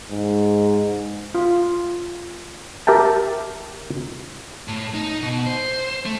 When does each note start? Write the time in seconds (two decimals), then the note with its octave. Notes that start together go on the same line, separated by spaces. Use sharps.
0.11 G#2
1.35 F4
2.87 G4 A#4 E5 G5 A5
4.68 A2
4.94 D#4
5.22 B2
5.47 C5
6.06 A3